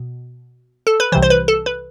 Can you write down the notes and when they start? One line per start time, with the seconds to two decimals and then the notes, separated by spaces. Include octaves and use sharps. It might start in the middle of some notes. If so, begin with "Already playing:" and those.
Already playing: B2
0.87 A4
1.00 B4
1.12 C2 C3 E3 C5
1.22 C5
1.30 B4
1.48 A4
1.66 B4